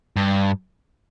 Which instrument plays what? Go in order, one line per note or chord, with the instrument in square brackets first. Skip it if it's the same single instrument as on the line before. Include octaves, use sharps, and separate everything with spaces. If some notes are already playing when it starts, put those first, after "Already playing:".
[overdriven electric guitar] G2